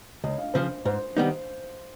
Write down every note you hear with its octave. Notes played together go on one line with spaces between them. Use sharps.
C#2 D#5
F5
C#3 F3 C5
G#2 C5
D#3 G3 B3 D#4